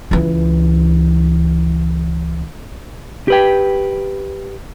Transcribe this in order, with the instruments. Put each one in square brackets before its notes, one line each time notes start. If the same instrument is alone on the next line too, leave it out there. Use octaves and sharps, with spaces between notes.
[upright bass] C#2 E3
[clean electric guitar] G4 B4 G5